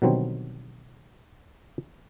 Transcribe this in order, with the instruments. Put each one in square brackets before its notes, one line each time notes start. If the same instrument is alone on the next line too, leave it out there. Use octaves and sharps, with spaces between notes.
[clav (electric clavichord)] B2 D3 D#3 F#3 G3 C4